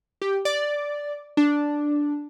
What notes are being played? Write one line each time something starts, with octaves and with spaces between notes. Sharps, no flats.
G4
D5
D4